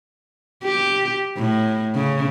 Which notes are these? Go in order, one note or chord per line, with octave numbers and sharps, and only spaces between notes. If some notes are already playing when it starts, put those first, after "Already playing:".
G4
A2
C#3